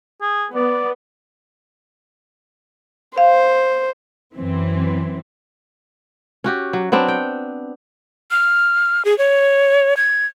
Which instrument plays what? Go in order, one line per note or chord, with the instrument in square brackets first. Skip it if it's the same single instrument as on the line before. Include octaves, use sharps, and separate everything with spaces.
[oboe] G#4
[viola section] B3 [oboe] D5
[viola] C5 [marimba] F5
[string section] F#2 E3 C4
[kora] C#4 F#4 G4
F#3
F#3 B3 C4 D4
G5
[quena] F6
G#4
C#5
G#6